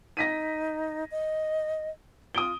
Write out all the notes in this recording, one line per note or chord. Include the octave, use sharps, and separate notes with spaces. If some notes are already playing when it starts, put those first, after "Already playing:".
D#4 A#6 B6 D#7
D#5
F4 D#6 D7 G7